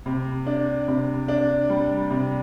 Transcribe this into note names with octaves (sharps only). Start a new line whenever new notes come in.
C3
D4
C3
D4
G3
C3